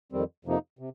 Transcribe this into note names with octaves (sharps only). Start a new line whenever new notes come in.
F2 D#3 G3 C4
F2 C3 F3 A#3 D#4
C3